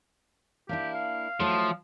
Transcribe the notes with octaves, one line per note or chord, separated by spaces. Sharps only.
A#3 D4 E4 G4
F5
F3 F#3 A3 E4